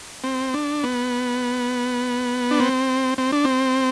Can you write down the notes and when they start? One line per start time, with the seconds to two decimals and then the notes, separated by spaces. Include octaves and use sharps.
0.24 C4
0.54 D4
0.84 B3
2.51 D4
2.60 C4
3.18 C4
3.32 D4
3.45 C4